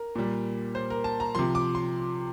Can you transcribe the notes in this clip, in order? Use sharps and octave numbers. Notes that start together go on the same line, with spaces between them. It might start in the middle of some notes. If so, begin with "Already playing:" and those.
Already playing: A#4
A#2 G3
C5
A#4
A5
A#5
C3 F3 C6
D6
C6